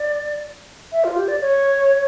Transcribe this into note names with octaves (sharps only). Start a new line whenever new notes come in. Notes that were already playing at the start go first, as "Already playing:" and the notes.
Already playing: D5
E5
F4
G4
D5
C#5